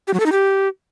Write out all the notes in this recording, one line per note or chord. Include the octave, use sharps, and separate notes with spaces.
G4
F#3
A4
D#4
G4